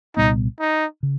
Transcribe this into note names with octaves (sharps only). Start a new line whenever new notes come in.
C2 A#2 G3 B3 D#4
D#4
C#3